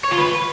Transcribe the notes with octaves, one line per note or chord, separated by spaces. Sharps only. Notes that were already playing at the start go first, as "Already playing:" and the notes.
C#5
F4
B4